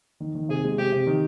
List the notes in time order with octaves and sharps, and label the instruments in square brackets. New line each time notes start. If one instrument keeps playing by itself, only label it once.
[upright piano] D#3
D#3
[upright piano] C3 [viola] G#4
[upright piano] G#3
[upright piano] C3 [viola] G4
[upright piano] C3
D#3